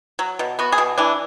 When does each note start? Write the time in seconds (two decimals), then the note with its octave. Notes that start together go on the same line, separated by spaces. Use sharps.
0.19 F#3
0.39 B2
0.59 B3 F#4
0.72 G#4
0.78 B2
0.98 E3 D4